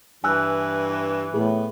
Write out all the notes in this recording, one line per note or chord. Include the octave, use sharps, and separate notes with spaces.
G2 E3 G#5 E6 F#6
A2 B3 G#4